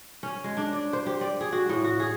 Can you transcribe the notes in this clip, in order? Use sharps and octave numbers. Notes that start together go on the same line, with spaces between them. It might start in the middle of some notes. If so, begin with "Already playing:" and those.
C#4
G#3
D4
D5
C5
G4
D5
G#4
F#4
A2
F#4
G#4